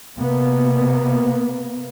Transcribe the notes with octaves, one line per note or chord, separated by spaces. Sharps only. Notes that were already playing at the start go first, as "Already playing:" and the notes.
C3 A#3 B3